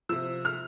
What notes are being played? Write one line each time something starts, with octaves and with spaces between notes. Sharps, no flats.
C3 F3 E6
F6